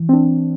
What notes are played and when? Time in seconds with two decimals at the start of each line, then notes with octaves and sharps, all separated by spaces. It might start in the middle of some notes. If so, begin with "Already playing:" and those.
Already playing: E3
0.09 C4
0.13 D4